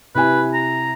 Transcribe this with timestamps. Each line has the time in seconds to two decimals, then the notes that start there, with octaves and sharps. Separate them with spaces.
0.15 C3 E4 B4 G#5
0.53 A#5